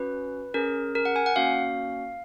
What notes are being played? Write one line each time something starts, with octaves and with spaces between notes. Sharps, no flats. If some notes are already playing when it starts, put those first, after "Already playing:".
Already playing: C#4 F#4 B4
C#4 G#4 A#4
A#4
F#5
G#5
F#5
A#3 C#4 F#4 F5